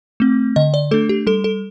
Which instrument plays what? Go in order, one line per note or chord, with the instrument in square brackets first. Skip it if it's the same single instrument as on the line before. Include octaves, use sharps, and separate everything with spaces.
[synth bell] A3 C4
D3 D#5
D5
A3 D4 A4
G4
G3 A4
A4